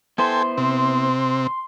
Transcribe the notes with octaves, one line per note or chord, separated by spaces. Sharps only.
B3 E4 A4 C5 G5 G#5 C6
C3 C4